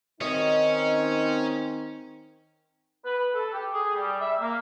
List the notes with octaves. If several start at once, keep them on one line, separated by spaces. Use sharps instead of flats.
D#3 C4 C#4 D#4 D#5
B4
A4
G4
G#4
G3
E5
A#3